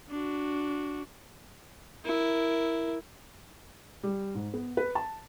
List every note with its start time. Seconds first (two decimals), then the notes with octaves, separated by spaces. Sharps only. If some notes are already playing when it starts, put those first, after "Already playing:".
0.10 D4 F#4
2.05 E4 A#4
4.03 G3
4.35 G#2
4.54 B3
4.77 B4
4.95 A5